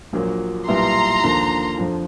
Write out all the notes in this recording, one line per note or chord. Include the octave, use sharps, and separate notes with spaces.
A#1 A#2 F#3 A#3
B1 A#2 G3 B3 E4 A#5 C6
D#2 D3 F3 A#3
F2 D3 F3